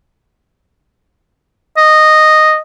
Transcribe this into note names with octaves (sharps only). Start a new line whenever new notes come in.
D#5